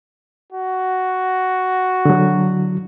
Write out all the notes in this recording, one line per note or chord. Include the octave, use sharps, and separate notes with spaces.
F#4
D3 F#3